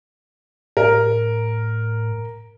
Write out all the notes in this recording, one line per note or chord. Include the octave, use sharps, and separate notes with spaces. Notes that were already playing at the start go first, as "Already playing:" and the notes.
A2 A#4